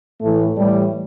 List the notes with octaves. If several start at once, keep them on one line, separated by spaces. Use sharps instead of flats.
A2 E3 A3
A2 E3 G3